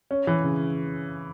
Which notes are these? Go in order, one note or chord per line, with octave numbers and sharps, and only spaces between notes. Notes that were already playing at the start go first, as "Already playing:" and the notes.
C#4
E3
C#3